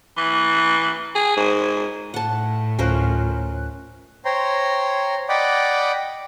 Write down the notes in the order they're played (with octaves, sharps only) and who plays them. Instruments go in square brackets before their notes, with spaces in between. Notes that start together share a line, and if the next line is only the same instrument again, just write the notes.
[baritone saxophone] E3
G#4
G#2
[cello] A2 [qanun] F#5 A5
[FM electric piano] D2 F4 F#6 [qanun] C#4 A#4 C5
[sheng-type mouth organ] C5 C#5 G5 A#5 C6
D5 D#5 F#5 G5 B5 D6